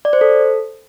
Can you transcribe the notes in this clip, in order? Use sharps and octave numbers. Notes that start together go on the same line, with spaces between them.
D5
C5
A4